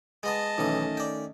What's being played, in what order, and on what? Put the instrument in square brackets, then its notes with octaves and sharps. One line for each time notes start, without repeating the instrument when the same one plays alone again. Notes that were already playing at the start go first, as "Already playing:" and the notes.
[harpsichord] G#3 B3 D#6 [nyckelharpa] D#5 A5
[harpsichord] B1 E3 D#6 [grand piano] D#3 A3 C#4
[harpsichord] D5 G5